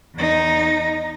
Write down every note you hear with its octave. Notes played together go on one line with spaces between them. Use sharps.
E2 D#4